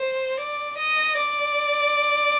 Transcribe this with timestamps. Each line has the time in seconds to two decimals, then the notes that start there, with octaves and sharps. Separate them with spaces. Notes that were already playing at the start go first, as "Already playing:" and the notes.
Already playing: C5
0.39 D5
0.77 D#5
1.17 D5